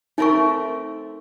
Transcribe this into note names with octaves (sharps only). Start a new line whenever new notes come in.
A3 C4 D#4 A#4 C#6